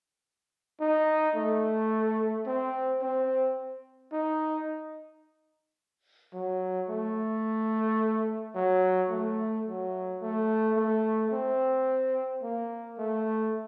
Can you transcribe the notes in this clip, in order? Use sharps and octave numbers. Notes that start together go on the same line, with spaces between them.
D#4
A3
C4
C4
D#4
F#3
A3
F#3
A3
F#3
A3
A3
C4
A#3
A3